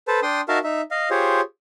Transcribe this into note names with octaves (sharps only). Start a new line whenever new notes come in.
A4 B4 C5 A5
D4 G5 C6 D#6
D#4 F#4 A#4 E5 F5 A5
D#4 E5
D#5 F5
F4 G4 G#4 C5 C#5